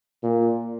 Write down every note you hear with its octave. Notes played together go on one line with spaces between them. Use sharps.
A#2